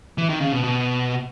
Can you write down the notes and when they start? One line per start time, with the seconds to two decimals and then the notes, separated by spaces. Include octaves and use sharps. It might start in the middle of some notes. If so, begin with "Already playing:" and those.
0.18 E3
0.29 D#3
0.41 C#3
0.52 B2
0.64 B2